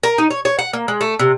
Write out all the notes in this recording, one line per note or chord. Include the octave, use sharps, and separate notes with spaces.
A#4
D#4
C#5
C#5
F#5
A#3
G#3
A3
C3